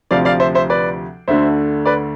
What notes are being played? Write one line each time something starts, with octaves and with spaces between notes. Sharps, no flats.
D2 C3 F3 D5 F5
D5 F5
C5 E5
C5 E5
B4 D5
D2 D3 A3 C5 E5
B4 D5